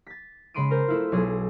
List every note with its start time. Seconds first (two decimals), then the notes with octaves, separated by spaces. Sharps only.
0.07 A6 B6
0.54 C#3 G#3 B5 C6 D7 D#7
0.71 A#4 C5
0.88 A3 E4 F4
1.12 B1 F#3 G#4